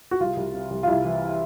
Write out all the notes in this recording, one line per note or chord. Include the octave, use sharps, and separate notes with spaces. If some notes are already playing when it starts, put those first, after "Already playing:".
F#4
C2 F4
C2
C3
C2
F4
C2 E4
E3